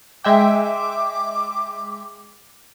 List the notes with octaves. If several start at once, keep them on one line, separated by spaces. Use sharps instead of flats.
G#3 E5 G5 D6